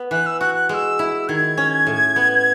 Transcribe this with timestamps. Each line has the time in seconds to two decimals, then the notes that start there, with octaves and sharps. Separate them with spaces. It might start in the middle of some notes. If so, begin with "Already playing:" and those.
Already playing: B3
0.11 E3 F#6
0.26 E6
0.40 F#4 F#6
0.55 F#6
0.69 G#3 F#6
0.74 E6
0.99 E4
1.28 D#3 G#6
1.58 C#4
1.87 A2
2.16 B3